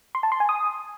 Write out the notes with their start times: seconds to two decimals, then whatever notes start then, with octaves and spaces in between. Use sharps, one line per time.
0.15 C6
0.23 A5
0.32 C6
0.40 G#5
0.49 D#6